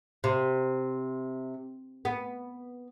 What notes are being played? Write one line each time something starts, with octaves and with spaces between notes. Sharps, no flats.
C3
B3